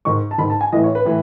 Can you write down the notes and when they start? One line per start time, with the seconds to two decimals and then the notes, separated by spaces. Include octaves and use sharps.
0.05 G#2 D#3 C#6
0.31 A5
0.38 G#2 D#3 B5
0.50 A5
0.61 G#5
0.72 A2 E3 D#5
0.84 C#5
0.95 B4
1.05 A2 E3